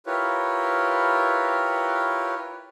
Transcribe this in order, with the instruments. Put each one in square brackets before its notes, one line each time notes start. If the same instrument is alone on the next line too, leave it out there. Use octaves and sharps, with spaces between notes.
[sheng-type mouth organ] E4 F4 G4 A#4 B4 C#5